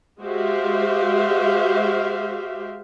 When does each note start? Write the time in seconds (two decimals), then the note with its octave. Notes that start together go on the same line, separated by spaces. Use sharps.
0.21 G#3 F#4 G4 C5 E5 F5